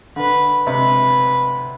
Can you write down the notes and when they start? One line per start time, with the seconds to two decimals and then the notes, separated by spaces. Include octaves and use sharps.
0.16 D3 B4
0.66 C3 B4